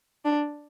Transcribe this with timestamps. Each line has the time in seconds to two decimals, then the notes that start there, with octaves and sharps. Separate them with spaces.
0.25 D4